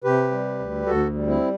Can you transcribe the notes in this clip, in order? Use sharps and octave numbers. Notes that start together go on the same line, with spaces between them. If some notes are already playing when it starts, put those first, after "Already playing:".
C3 G4 B4
G3
D2
D2 F#4 A4
G3
C4 E4